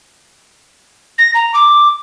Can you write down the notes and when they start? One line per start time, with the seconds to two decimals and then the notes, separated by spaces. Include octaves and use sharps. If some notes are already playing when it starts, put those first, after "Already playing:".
1.18 A#6
1.34 A#5
1.54 D6